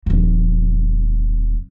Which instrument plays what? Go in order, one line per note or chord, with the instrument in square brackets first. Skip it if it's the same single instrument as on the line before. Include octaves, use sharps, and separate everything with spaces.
[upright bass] D#1 F2